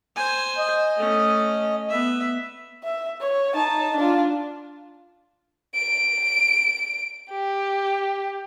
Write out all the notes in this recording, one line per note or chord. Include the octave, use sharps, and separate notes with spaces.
C5 G#5
D#5
A3 C#4
B3 E5
E5
C#5
D#4 A5
D4 F4
D7
G4